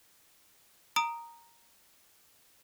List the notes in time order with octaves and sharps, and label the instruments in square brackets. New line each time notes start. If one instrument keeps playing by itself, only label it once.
[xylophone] A#5 D#6 D7